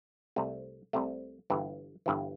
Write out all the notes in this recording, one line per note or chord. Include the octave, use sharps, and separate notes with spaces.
C2 C3 A3
C2 C3 A3
G1 G2 E3
G1 G2 E3